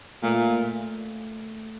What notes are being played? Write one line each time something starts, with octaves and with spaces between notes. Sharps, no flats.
A#2 A3